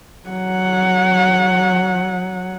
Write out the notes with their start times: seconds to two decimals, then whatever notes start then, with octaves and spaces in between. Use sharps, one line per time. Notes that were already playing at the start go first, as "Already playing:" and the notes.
0.29 F#3 F#5